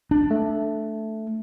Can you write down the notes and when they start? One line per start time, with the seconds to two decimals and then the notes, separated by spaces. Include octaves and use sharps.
0.11 D4
0.31 A3